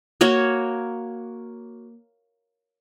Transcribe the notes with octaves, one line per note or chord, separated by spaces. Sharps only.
A#3 F#4 C#5